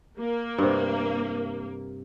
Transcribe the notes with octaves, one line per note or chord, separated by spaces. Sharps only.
A#3
G2 C3